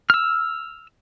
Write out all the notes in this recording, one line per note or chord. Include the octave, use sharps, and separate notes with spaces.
E6 F6